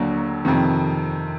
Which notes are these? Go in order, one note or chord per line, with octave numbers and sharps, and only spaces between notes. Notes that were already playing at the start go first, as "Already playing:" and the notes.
Already playing: D#2 D3 F#3 A#3
F2 C3 D#3